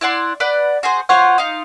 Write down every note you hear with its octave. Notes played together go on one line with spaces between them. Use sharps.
E4 D5 F#5 C6
B4 D5 F#5
F#4 G#4 C5
F4 C5 C#5 F#5
D#4 F4